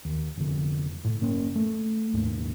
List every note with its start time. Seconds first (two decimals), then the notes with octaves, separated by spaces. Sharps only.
0.05 D#2
0.37 F1 D3
1.04 A2
1.21 F#1 A#3 C#4
1.56 A3
2.13 D#1 D#2 G#2